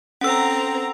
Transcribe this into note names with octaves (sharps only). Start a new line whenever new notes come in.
C4 C#4 A4 F#5 A#5 E6